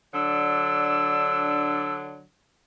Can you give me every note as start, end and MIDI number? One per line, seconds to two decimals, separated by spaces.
0.14 2.25 50
0.14 2.25 54
0.14 2.25 62
0.14 1.93 88